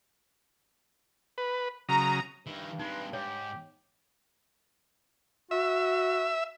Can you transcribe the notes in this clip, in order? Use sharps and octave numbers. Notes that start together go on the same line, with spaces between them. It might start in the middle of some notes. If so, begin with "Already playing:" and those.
B4
C#3 F#3 A#5 D#6
G2 D#3 E4
G#3 C4 D#4 B4
G#2 G4 C#5
F#4 E5